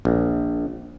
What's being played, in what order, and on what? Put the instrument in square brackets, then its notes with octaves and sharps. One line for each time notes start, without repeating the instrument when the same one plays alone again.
[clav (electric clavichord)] A#1